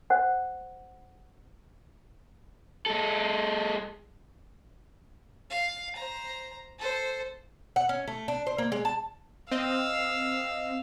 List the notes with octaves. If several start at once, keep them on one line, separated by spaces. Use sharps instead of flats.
C5 F#5
G#3 A4
F5
C5 A#5
A4 C5
F#5
C#4
A3
D4
C5
A#3
G#3
A5
C4 D#5 F5 E6